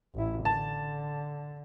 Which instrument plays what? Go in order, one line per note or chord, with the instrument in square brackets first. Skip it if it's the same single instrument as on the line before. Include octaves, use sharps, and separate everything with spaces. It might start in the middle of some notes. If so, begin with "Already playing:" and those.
[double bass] A1 E4
[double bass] D3 [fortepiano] A5